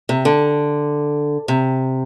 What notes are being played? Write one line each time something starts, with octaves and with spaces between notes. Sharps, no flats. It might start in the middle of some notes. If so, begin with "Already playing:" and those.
C3
D3
C3